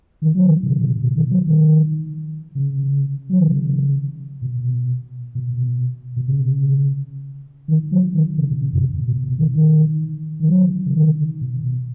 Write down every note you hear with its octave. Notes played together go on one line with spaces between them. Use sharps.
D#3
F#3
D#3
B2
C#3
B2
B2
B2
D#3
F#3
D#3
C#3
F#3
D#3
C#3
B2
B2
B2
C#3
D#3
F#3
D#3
C#3
B2
C#3
F#2
B2
B2
B2
D#3
D#3
D#3
F#3
C#3
D#3
B2